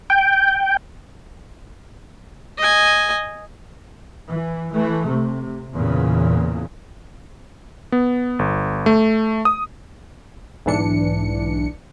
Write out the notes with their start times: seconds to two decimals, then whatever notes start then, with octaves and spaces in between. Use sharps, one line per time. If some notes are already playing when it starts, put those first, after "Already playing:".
0.10 G5
2.58 D#5 G#5
4.29 E3
4.73 E3 A3
5.07 C3
5.74 E2 A#2 C#3
7.92 B3
8.39 G1
8.86 A3
9.45 D#6
10.66 B1 G#2 E3 D4 C#7